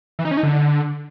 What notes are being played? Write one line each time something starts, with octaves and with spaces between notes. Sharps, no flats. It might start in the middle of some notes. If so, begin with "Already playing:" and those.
E3
D#4
C#4
D#4
D3